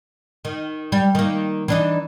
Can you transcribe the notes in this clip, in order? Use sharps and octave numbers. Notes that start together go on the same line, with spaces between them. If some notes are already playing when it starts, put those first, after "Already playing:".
D#3
G3
D#3 A#3
E3 D4 D#4